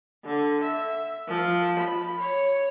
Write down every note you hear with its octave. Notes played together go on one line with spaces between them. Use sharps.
D3
E5
F3
B5
C#5